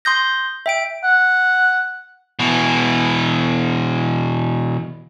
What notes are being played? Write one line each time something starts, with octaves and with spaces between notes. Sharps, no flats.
C6 D#6 G6 A#6
E5 G5 D7
F#5
B2 E3